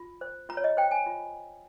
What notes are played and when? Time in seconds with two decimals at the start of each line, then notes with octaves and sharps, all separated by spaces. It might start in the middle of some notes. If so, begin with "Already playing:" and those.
Already playing: F4
0.21 C5
0.49 F4 A#5
0.57 C#5
0.64 D#5
0.77 C5 G5
0.91 G#5
1.06 F4